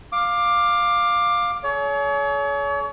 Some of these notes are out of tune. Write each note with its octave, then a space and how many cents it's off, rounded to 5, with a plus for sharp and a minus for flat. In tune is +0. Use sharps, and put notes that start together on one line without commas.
F5 +10 D6 +15
G#4 +45 C#5 +35